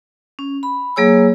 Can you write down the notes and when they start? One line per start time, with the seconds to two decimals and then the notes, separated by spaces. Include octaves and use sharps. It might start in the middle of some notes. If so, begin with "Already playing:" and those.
0.39 C#4
0.63 B5
0.96 F#3 A#3 G#4 C#5 G#5 E6